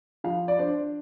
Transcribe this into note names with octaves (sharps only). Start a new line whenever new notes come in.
F3 F5
D5
D4 C5